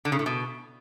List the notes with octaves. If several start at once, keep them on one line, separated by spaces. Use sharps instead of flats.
D3
C#3
A2
B2